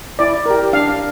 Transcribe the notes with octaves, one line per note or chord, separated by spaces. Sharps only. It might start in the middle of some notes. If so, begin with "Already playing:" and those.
E4 D5
G4 A#4
D4 F5